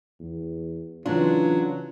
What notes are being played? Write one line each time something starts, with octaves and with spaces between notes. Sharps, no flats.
E2
C#3 E3 F#3 D4 F4